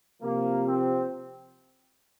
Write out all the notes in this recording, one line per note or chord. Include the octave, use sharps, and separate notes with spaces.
C3 F3 A#3
C4